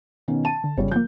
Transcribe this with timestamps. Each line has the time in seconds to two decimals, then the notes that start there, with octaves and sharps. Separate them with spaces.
0.28 B2 D#3 C#4
0.45 A5 D#7
0.64 D3
0.77 G1 C#3 G3 C#5
0.92 F3 A#3 G6